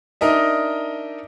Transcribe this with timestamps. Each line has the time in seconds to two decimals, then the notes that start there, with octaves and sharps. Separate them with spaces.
0.21 D4 D#4 A#4 D#5 E5